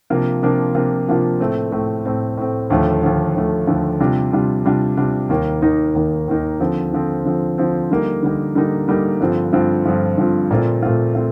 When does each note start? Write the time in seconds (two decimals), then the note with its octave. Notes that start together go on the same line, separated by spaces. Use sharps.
0.10 C3 F3 A#3 D4 F4
0.42 C3 F3 A#3 D4 F4
0.74 C3 F3 A#3 D4 F4
1.08 C3 F3 A#3 D4 F4
1.40 A2 A3 C4
1.72 A2 A3 C4
2.05 A2 A3 C4
2.37 A2 A3 C4
2.70 D#2 D3 F3 A3
3.02 D#2 D3 F3 A3
3.35 D#2 D3 F3 A3
3.67 D#2 D3 F3 A3
4.00 C3 G3 D4 F4
4.32 C3 G3 D4 F4
4.65 C3 G3 D4 F4
4.97 C3 G3 D4 F4
5.29 D#2 D#3 A#3 D#4
5.62 D#2 D#3 A#3 D#4
5.94 D#2 D#3 A#3 D#4
6.28 D#2 D#3 A#3 D#4
6.60 D3 F3 C4
6.93 D3 F3 C4
7.25 D3 F3 C4
7.58 D3 F3 C4
7.90 D3 G3 A#3 D#4
8.23 D3 G3 A#3 D#4
8.55 D3 G3 A#3 D#4
8.88 D3 G3 A#3 D#4
9.20 G2 D3 F3 C4 F4
9.53 G2 D3 F3 C4 F4
9.85 G2 D3 F3 C4 F4
10.18 G2 D3 F3 C4 F4
10.51 A#2 A3 C4 F4
10.82 A#2 A3 C4 F4
11.15 A3 C4 F4